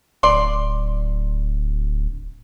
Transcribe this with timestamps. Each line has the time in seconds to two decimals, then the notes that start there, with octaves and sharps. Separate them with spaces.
0.23 D1 D5 C6